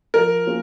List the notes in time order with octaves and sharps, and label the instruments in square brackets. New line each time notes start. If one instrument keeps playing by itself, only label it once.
[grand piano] F3 [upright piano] A#4
[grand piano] A#3 C#4 F4 G#4